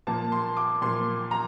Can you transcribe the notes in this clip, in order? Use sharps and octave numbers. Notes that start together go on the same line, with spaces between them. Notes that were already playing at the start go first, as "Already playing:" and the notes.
A#2 F3 A#3 A5
C6
D6
A#2 F3 A#3 C6
A#5